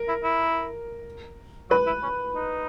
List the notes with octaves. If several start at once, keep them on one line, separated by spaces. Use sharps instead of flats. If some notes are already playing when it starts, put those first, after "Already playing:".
Already playing: A#4
E4
E4
F#3 B4
E4
C#4
D#4